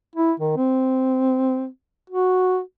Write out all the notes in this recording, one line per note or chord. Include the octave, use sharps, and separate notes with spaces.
E4
D#3
C4
F#4